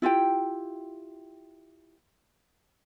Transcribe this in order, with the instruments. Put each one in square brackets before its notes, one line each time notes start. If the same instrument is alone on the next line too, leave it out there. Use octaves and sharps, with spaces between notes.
[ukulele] E4 F4 G4 G5